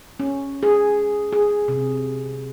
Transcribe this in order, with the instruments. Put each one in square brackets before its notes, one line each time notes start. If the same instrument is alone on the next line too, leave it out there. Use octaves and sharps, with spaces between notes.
[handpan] C#4
G#4
G#4
C3